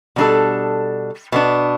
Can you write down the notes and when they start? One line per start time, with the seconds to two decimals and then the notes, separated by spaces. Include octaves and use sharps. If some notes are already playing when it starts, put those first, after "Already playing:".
0.16 B2 G3 D4 A4
1.32 B2 B3 D4